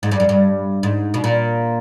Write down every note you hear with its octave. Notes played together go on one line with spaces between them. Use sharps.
G#2
G2
F#2
G2
G#2
B2
A#2